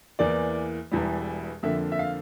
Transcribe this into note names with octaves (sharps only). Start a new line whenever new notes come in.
E2 E3 A#3 D5
E1 E2 E3 G3
F2 D3 F3 A#3 E5
E5
F5